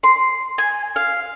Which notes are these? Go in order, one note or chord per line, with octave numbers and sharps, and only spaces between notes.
C6
G#5
F5